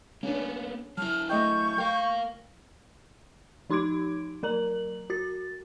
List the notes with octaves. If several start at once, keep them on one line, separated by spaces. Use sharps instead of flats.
A#3 B3 C#4 D4
F#3 E4 A5 F6
A3 D#5 G5 C#6 G6
A#4 F5 G5
F3 D#4 C6 D6 G#6 D7
F#3 A#4 A#5 F#7
F#4 A6